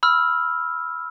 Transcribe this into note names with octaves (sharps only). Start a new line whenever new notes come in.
B5 E6 F6